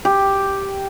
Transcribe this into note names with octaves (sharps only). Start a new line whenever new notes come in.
G4